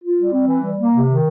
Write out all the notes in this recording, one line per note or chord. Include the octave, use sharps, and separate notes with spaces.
F4
G3
C4
E3
G3
A#3
C3
D#3